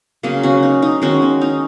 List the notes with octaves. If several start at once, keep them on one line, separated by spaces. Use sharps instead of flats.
C#3 F#3 A#3 C#4
C#4 F#4
D#4
D#4
D#3 G#3 C#4 F#4
C#4
D#4